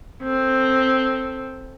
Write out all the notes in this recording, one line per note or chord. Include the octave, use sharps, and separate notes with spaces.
C4 A4